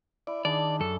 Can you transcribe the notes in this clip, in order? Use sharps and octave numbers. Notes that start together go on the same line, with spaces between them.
E4 D5
D#3 D4 G#4 D5 G#5
F#2 A4